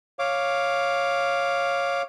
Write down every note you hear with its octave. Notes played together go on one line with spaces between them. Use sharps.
C#5 F5 D6